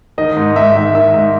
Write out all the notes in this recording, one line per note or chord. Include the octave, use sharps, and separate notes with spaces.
D#3 D#5
G#2
G#2 E5
D#3 E5
D#3 E5
G#2